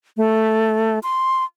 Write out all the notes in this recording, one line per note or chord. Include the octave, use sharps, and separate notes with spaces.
A3
C6